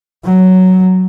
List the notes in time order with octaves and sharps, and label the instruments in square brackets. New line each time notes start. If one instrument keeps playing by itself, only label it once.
[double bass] F#3